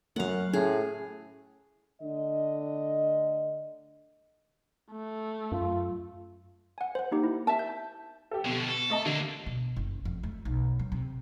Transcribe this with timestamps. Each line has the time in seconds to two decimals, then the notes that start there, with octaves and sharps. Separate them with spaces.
0.16 F#2 F#3 A3 F5 F#5
0.53 A2 C#4 G#4
2.01 D3 A3 D4 D#5
4.92 A3
5.52 F#2 F4
6.78 F#5 G#5
6.95 C5 F#5
7.11 A#3 D#4 G4
7.23 E4
7.47 E5 A5
7.59 G6
8.31 G4 A4
8.45 B2 D3 F3
8.69 A4
8.90 A3 D#5 A5
9.06 D3 A#3 D4
9.46 B2
9.76 F#1
10.05 F2
10.23 A3
10.45 B1
10.79 F#3
10.92 C3